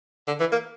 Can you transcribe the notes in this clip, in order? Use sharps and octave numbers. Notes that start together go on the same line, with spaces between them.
D3
E3
A#3